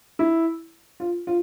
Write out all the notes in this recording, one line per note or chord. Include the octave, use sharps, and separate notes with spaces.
E4
F4
F4